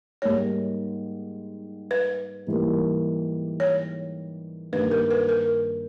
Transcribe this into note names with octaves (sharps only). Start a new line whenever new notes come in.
G#2 G3 A#3 D#4 C#5
B4
G#2 E3 G3 A#3
C#5
G2 D#3 A#3 B4
A#4
B4
A#4